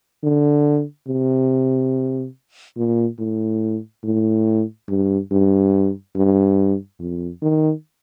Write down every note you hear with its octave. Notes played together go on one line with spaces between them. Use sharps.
D3
C3
A#2
A2
A2
G2
G2
G2
F2
D#3